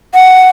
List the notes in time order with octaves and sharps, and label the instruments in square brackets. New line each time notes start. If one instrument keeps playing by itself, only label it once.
[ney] F#5